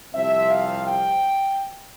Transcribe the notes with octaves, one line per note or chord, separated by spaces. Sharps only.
C2 C3 F3 C4 E5
F5
G5